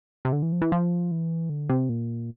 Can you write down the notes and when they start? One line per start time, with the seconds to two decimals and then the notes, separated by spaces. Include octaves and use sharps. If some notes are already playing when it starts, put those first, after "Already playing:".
0.25 C3
0.33 D3
0.42 E3
0.52 F3
0.62 E3
0.72 F3
1.11 E3
1.50 D3
1.69 C3
1.89 A#2